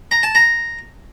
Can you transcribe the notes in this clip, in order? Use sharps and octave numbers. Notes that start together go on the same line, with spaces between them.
A#5
A5
A#5